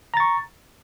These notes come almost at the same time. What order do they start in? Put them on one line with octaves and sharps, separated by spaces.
A#5 A6 C#6